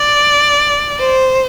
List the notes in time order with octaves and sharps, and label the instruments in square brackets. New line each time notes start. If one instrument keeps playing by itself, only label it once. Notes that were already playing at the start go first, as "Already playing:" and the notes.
Already playing: [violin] D5
C5